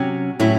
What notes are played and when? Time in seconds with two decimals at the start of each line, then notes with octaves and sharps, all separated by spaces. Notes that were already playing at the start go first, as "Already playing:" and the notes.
Already playing: C3 F#3 C#4
0.39 A2 F#3 C#4 E4